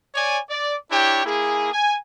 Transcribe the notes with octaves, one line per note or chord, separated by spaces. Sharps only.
C#5 D5 G#5
D5
D4 E4 G4 C#5 G5
A#3 E4 G#4
G#5